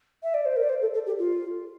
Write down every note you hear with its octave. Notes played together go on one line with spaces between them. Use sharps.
E5
D5
C5
A#4
D5
C5
A4
A4
G4
F4